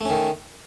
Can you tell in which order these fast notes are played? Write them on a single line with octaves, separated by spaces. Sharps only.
A3 C#4 D#3